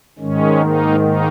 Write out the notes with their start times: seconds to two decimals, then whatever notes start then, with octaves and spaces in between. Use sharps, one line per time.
0.19 G#2 D#3 G#3 C#4
0.59 A#3 D#4
1.00 A#3 D#4